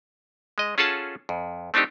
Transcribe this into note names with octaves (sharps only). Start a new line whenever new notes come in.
G#3 D#5
C#4 F4 G#4 A4 F#5 A5
F2
A3 C4 D4 D#4 G4